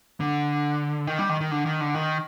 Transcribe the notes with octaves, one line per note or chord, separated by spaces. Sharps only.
D3
D#3
G3
D#3
D#3
D3
D#3
D3
D#3